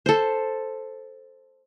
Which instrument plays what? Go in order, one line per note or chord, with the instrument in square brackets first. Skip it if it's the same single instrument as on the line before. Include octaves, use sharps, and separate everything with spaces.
[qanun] A4 C5